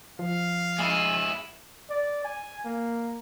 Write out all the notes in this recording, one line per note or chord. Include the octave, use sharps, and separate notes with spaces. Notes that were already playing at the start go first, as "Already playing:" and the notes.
F3 F5
G#3 E4 G#5
D5
G#5
A#3